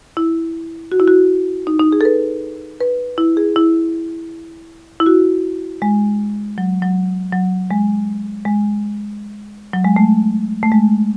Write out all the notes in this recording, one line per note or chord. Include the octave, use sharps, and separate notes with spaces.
E4
F#4
E4
F#4
D#4
D#4
G#4
A4
B4
B4
E4
G#4
E4
E4
F#4
G#3
F#3
F#3
F#3
G#3
G#3
F#3
G#3
A3
A3
G#3